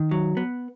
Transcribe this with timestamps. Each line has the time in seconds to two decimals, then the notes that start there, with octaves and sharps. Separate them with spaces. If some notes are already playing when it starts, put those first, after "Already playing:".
Already playing: D#3
0.11 F#3
0.37 B3